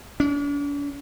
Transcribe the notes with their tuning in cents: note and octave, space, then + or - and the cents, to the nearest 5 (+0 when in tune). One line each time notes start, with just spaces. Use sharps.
D4 -45